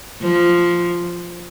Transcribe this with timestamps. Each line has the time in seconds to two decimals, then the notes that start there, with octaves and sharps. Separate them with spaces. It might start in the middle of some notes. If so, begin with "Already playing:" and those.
0.21 F3